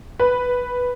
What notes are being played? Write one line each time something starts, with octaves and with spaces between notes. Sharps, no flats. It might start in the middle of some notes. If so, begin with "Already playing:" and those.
B4